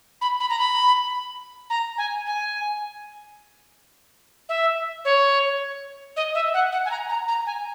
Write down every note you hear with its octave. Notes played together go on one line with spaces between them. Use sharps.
B5
B5
A#5
B5
A#5
G#5
G#5
E5
C#5
D#5
E5
F#5
F#5
G#5
A#5
A#5
A#5
G#5